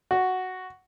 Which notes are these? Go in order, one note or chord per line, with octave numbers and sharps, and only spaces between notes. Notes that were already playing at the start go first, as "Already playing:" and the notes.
F#4